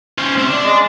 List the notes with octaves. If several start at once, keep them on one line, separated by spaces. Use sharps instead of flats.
C#4 C5
C4 E5
D4
G#3